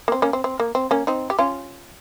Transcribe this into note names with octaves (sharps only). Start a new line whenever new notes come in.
A#3
C4
A#3 C#4
C4
C4
A#3
C4
A#3 C#4
C4 D#4
G4
C#4 F4